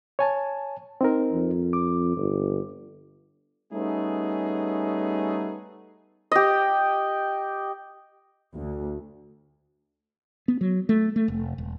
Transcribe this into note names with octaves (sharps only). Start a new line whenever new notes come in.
C#5 G#5 A5
C4 D#4 A#4
F2
D6
G1
G3 A3 B3 C#4 D#4 G#4
G4 D#5
D2
B3
F#3
A3
A3
F1
E1